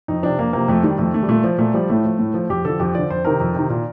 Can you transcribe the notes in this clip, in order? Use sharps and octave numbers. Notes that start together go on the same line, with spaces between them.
F2 D#4
C3 F3 D4
F2 A#3
C3 F3 A#3
F2 A3
D#3 G3
F2 A3
D#3 A3
G3
A#2 A3
F3
A#2 A3
F3 G3
A2 A3
F3
A2
F3
F2 G4
D3 F3 A4
F2 G4
D3 F3 D5
F2 C5
C3 D#3 A#4
F2
C3 D#3
A#2